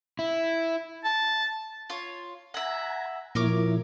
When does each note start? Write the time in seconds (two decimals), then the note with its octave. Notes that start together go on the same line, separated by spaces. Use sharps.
0.19 E4
1.05 A5
1.90 F4 C#5
2.54 E5 F#5 G#5 A#5
3.35 A#2 F3 A#3 E4 A#4 C#5 D6